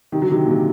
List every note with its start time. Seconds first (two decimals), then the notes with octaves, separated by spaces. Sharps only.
0.12 C3 D#3
0.22 D3 F#3
0.31 C3 D#3
0.46 A#2
0.51 C3